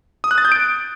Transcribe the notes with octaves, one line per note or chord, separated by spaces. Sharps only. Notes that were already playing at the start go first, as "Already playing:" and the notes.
D#6
F#6
A6
G6
D7